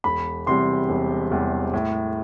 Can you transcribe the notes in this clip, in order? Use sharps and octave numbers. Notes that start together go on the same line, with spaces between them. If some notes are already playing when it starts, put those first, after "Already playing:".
E1 B5
E2 C3 G3 C6
E1
E2 C3 G3
A2